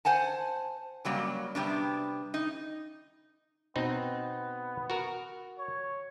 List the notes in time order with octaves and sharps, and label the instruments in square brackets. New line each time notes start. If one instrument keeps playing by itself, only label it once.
[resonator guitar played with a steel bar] C5 F#5 G#5 A5
C#3 F#3 G3 A#3
C3 G3 B3 D4
D#4
[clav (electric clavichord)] B2 C4 D#4 [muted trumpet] B3
[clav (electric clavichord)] F#4 A#4
[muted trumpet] C#5